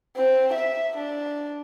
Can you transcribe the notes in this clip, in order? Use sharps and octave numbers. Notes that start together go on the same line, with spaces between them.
C4
E5
D4